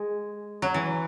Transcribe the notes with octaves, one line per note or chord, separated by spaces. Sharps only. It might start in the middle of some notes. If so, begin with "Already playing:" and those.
Already playing: G#3
F#3
E3